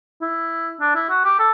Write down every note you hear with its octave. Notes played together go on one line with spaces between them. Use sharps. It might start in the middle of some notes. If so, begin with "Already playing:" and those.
E4
D4
E4
F#4
G4
A4